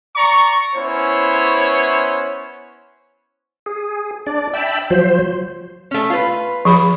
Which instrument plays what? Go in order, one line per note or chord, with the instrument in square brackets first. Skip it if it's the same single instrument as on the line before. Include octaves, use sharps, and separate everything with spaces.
[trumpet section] D5 A#5 C#6
B3 C#4 E4 C5 C#5
[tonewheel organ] G#4
D4 D5
E5 G5 A5 B5
F3 F#3 C5
[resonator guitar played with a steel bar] A3 C#4
F4 B4
[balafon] F3 G#4 B5